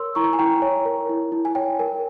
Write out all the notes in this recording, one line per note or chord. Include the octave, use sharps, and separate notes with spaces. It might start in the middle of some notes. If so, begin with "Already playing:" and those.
Already playing: A#4 C#5 C6 E6
E4 A#5 C#6
G#5
E4 G5 A#5
C#5
A#4
E4
E4
G#5
C#5 G5
A#4 G#5